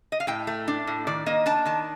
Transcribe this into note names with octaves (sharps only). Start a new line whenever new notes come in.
D#5
F5
A2 G5
A3
D4
A2
D#3 D5
A#3 D#5
D4 A5
D#3 A5